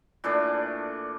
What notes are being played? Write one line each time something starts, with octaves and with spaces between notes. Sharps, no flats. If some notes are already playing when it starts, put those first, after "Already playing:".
A#2 E3 A3 D4